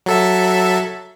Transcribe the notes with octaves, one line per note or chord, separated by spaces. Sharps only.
F#3 A4 E5